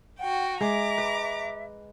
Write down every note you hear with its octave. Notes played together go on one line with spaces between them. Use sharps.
F#4 F#5 G5
G#3 E5 A#5 D6
B4